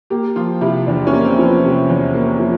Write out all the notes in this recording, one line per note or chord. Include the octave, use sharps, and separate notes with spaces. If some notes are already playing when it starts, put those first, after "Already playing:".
A#3 G4
F3 F4
C3 E4
E2 D4
C#4
A#3
C4
F3
B3
C3
E2
A#3
F3